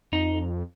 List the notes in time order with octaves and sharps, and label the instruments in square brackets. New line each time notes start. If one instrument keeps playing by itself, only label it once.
[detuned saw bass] F2 [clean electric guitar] D#4